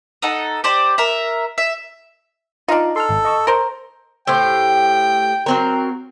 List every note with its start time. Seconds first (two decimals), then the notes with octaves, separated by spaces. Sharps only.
0.22 D#4 A4 F#5
0.64 G4 C5 D5
0.98 A#4 E5
1.58 E5
2.68 D4 D#4 F4 F5
2.96 A4 C6 F6
3.09 G#1
3.25 D#5 C#6 E6
3.47 A#4 C5
4.27 A2 G4 C5 G5
5.46 F#3 C4 A#4